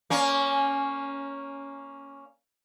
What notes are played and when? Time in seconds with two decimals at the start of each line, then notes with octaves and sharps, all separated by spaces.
0.10 A#3 C#4